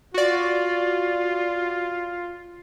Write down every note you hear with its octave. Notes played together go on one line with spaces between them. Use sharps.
F4 F#4 D5